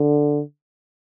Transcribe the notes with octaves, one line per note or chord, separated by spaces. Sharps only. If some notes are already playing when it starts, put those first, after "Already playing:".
Already playing: D3